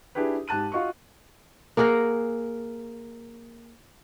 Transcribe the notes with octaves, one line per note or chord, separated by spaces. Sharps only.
D4 E4 G4 G#4 B4
G#2 G4 A5 F#6 D#7
F4 F#4 D#5 C#6
A#3 G#4 A#4 F#5